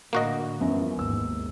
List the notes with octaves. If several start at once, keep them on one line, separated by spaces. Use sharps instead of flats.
A2 D3 A#3 F#4 D#5
F#2 E3 F3 G3 B3
G#1 D#2 G#2 E6